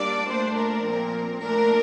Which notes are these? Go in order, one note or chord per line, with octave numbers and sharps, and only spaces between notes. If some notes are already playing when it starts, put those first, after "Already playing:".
Already playing: G3 A#3 D4 D5
A#2 A3 D4 C5
A#4
A#2 F3 C4
A#2 A3 D4 A#4